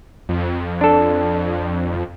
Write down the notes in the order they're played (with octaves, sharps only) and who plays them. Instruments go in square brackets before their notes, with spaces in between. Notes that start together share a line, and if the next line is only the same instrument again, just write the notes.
[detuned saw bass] F2
[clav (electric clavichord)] D4 A4